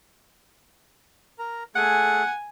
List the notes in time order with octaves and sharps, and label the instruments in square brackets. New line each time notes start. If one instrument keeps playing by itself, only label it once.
[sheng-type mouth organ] A#4 A#5
[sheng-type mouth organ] A3 G#4 [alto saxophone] F#5 [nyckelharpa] G#5